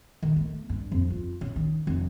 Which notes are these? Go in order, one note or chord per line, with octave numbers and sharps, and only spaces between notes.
D#3
A3
G2
F2
F4
C#3
D#3
F1